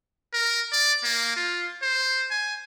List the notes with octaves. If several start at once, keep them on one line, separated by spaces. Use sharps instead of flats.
A#4
D5
A#3
F4
C5
G#5